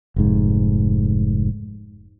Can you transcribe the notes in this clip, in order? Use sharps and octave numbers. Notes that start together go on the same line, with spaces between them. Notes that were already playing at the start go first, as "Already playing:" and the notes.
F1 G#2